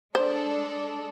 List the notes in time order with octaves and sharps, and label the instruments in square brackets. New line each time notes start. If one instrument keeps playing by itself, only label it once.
[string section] G#3 D4 A4 [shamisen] C5